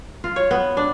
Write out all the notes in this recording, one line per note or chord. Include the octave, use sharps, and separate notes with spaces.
F4
C#5
B3
D4